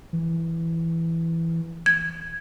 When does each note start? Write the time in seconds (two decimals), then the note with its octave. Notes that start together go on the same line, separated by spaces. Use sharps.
0.13 E3
1.86 G#6